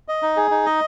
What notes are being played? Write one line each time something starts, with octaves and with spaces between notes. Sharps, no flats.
D#5
D#4
G#4
D#4
D#5